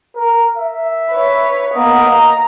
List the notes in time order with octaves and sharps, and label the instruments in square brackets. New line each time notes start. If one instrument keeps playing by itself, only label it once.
[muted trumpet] A#4
E5
[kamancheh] B4 C#5
[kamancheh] A#3 B3 [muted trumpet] D#5
[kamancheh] A#5